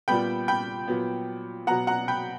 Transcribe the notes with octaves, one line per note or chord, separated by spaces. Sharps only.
A#2 G3 B3 G5 B5
G5 B5
A#2 F#3 B3
B2 F#3 B3 F#5 A#5
F#5 A#5
G5 B5